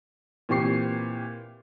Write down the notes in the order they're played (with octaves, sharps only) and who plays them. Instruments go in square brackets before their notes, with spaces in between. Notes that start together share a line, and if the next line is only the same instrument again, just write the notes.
[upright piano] A#2 E3 C4 G4 C#6 C7